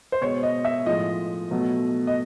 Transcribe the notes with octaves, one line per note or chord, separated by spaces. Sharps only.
C5
B2 G#3 C#5
D#5
E5
A2 F3 G#3 D#5
B2 F#3 A3
D#5